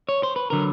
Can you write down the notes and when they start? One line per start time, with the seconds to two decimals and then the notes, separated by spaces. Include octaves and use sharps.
0.09 C#5
0.23 C5
0.36 B4
0.50 D3 F#3 A#4